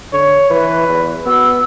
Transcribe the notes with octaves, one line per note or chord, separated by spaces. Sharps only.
D3 C#5
E3 B4
E2
B3 F#4 E6